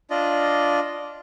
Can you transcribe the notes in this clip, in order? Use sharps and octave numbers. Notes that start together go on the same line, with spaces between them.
D4 F4 D5 D#5